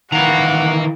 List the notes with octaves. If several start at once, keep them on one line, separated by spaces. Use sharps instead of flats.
D#3 E3 F5 F#5 A#5